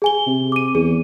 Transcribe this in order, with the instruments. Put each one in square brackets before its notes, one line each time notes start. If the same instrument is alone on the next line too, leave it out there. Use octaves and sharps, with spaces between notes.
[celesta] G#4 G#5 G7
[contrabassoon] C3
[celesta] D6 D#7
[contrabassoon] E2 [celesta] G#4